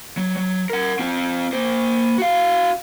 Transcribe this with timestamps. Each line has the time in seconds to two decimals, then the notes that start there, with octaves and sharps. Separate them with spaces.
0.17 F#3
0.37 F#3
0.70 A#4 F#5
0.99 C4 F4
1.53 A#3 C5
2.18 F#4 F5